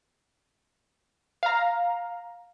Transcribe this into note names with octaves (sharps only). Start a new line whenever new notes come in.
F5 A#5